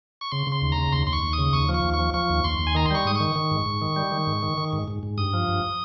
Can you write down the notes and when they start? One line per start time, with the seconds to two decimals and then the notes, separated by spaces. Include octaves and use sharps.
0.21 C#6
0.32 C#3 C6
0.47 C#3
0.52 C6
0.62 D#2
0.72 A#5
0.77 C#3
0.92 D#2 C6
1.07 D#2 C6
1.13 C#6
1.23 D#2
1.33 D#6
1.38 C#3
1.53 D#2 C#6
1.69 F3
1.74 C#6
1.84 D#2
1.94 C#6
1.99 F3
2.14 F3 C#6
2.29 D#2
2.44 D#2 C6
2.59 D#2
2.67 G#5
2.75 D#3 A#5
2.86 C6
2.91 G3 C#6
3.05 G#2 D#6
3.15 D#3 C#6
3.36 D#3
3.51 G#2
3.66 G#2
3.82 D#3
3.96 G3
4.12 D#3
4.27 G#2
4.42 D#3
4.58 D#3
4.73 G#2
4.88 G#2
5.03 G#2
5.18 G2 D#6
5.33 F3
5.48 G2